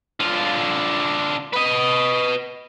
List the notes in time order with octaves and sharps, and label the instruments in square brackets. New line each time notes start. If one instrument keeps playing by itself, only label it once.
[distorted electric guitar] D3 F4
B4 D#5